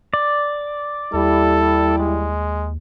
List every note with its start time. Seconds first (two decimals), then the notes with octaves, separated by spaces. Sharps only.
0.14 D5
1.14 D#2 G3 E4 A4
1.98 G#3